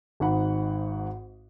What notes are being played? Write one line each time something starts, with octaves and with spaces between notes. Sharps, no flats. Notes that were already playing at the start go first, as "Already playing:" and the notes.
G#1 G#2 D#4 F#5 B5